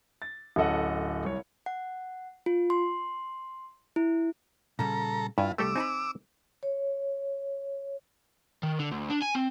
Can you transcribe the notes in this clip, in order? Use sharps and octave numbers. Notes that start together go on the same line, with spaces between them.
A6
D1 C#4 A4 D#5 F#5
C2 C#5
F#5
F4
C6
E4
A#2 C#3 G3 A4 A#5
G2 E4 F4 G#5
C2 G3 A3 G4 A4 D6 E6
C4 D#4 G#5 A5 B5
C#5
D#3
D3
D2
D4
G#5
C4